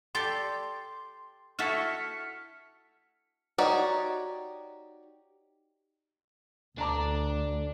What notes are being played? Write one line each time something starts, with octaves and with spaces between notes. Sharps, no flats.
G4 A4 D5 C6
E4 F#4 A4 F6 B6 C#7
D#4 F#4 G4 C#5 D5
D2 D4 A5 A#5 D6